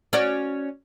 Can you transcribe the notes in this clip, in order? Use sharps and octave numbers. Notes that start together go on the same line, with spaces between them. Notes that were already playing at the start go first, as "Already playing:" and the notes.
C#4 F#4 D5